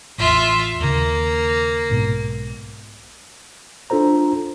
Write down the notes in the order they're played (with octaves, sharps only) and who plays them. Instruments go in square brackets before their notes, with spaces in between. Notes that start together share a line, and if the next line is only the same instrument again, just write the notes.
[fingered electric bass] A1 E2 [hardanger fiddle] F4 E5
[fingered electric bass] D#2 C#3 [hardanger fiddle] A#3
[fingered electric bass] B1 G#2 B2
[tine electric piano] D4 F4 A4 C5 A#5